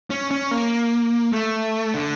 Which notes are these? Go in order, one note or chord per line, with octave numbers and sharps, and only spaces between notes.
C#4
C#4
A#3
A3
D3